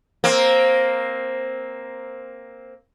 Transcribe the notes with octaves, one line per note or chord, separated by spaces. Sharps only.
A#3 C4